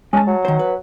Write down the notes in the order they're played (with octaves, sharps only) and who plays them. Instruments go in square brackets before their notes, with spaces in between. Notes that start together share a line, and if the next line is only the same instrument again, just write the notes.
[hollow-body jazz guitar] G#3 A5 [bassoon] C#4
[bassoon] F#3
[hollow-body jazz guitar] D#3 C5
B4